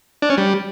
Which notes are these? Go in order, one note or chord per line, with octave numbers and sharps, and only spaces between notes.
D4
C#4
G3